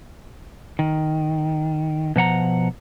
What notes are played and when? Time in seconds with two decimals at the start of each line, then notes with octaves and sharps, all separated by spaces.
0.79 D#3
2.16 B2 F3 F#5 A#5